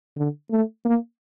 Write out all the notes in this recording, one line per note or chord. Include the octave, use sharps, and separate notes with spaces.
D3
A3
A#3